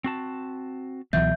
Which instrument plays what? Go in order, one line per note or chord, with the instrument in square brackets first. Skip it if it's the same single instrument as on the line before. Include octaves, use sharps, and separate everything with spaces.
[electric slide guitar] C4 F#4 A5
[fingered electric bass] C#2 E3 F#3 [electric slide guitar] B2 [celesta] E5 G6